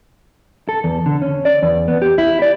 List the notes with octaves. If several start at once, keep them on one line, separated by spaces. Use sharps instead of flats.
A4
E2
D3
C#4
D5
E2
B3
G4
E4
D5